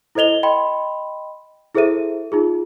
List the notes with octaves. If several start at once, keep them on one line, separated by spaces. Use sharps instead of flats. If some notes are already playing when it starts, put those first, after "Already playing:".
E4 A4 C5 D#5 F7 G7
D#5 G5 B5 C6
E4 G#4 A4 C5 E5 D#7
D#4 F4 G#4